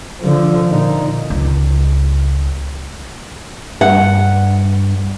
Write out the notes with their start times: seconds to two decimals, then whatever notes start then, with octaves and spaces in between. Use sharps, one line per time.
0.22 D3 F3
0.70 A#2 D#4
1.30 C#2
3.81 G2 F#5